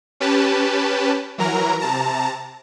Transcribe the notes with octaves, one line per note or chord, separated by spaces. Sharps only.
C#4 G4 B4 A5
E3 F#3 A#4 A#5
C3 A5 A#5